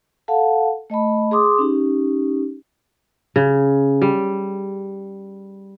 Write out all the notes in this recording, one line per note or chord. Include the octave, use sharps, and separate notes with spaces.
A4 F5 F#5 A5
A3 D#5 A5 B5
G#4 C6 D6 D#6
C#4 D#4 G4
C#3
G3